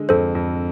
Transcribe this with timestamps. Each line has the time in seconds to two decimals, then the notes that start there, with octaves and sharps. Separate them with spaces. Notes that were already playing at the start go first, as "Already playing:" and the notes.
Already playing: D3 G#3
0.09 F2 A4 C5
0.35 F2